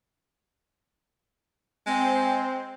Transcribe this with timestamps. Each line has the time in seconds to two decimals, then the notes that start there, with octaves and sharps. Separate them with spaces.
1.86 G#3 C4